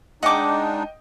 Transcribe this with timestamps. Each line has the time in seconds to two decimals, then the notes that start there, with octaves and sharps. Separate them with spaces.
0.23 G#3 D4 D#4 D#5 F#5 G5 D6